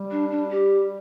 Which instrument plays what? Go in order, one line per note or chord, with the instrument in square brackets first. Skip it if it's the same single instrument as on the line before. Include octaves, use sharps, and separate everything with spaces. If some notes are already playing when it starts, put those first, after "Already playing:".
Already playing: [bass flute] G3
[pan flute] D4
D4
G4